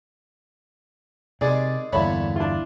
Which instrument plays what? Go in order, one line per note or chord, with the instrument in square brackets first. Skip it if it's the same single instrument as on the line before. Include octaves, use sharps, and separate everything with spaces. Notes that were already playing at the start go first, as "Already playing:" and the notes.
[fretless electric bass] C3 [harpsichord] D#3 G#3 [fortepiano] G#4 D5
[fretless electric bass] G1 E2 [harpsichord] A#2 D3 [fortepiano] C#5 E5 B5
[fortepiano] D4 E4 F4